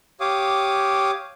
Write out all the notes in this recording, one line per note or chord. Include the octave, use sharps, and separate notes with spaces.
G4 C#5 F5 D6 D#6